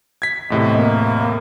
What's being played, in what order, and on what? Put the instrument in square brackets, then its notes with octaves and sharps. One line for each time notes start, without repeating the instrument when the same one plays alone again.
[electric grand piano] G#6 B6
[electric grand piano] E2 A2 C3 [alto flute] D#5
[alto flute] A#3